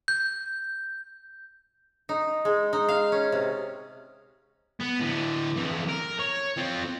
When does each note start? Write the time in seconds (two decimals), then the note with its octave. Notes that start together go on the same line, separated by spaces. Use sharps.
0.08 G6
2.09 D#4
2.45 G#3
2.73 D#4
2.89 F5
3.12 C#4
3.32 C3
4.80 B3
5.00 A2 D3
5.56 F2 E3
5.88 A#4
6.19 C#5
6.57 C4 F4